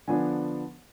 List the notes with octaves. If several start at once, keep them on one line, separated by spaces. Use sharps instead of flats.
D3 F3 B3 D4 G#5